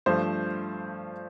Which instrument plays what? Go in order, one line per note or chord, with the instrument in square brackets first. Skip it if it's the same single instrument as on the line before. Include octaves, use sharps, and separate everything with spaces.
[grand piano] G2 F3 A3 C5